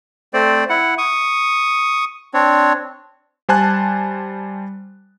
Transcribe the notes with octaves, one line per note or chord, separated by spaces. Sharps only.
A3 C4 C5 D5
E4 F#5
C#6 D#6
C4 D4 C#5
G3 C5 G#5 A5 F#6